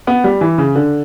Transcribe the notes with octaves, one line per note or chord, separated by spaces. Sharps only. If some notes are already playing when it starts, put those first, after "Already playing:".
B3
G3
E3
C#3
D3